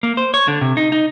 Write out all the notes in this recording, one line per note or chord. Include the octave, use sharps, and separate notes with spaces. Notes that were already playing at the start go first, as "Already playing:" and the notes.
A#3
C5
C#5
D3
C3
D#4
D#4